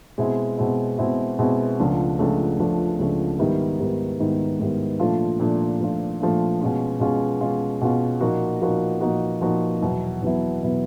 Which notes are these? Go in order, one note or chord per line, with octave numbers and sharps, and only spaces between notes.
B2 G#3 C4 E4
B2 G#3 C4 E4
B2 G#3 C4 E4
B2 G#3 C4 E4
C#2 C#3 F3 A3 D4
C#2 C#3 F3 A3 D4
C#2 C#3 F3 A3 D4
C#2 C#3 F3 A3 D4
G#2 D#3 G3 B3 E4
G#2 D#3 G3 B3 E4
G#2 D#3 G3 B3 E4
G#2 D#3 G3 B3 E4
A#2 F3 A3 D4 F4
A#2 F3 A3 D4 F4
A#2 F3 A3 D4 F4
A#2 F3 A3 D4 F4
B2 G#3 C#4 F4
B2 G#3 C#4 F4
B2 G#3 C#4 F4
B2 G#3 C#4 F4
A#2 F3 A#3 D#4 F#4
A#2 F3 A#3 D#4 F#4
A#2 F3 A#3 D#4 F#4
A#2 F3 A#3 D#4 F#4
E2 B2 F#3 B3 E4
E2 B2 F#3 B3 E4
B2 F#3 B3 E4